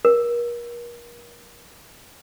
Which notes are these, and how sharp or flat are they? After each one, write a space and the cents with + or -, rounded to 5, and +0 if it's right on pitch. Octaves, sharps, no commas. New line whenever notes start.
A#4 +35